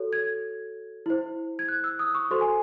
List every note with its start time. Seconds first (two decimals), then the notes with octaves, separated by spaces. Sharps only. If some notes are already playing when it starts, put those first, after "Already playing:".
Already playing: F#4 A4 C#5
0.13 G#6
1.06 E4 C5
1.59 G#6
1.68 F#6
1.84 E6
1.99 D#6
2.15 C#6
2.31 F#4 A4 C5 C6
2.41 G#5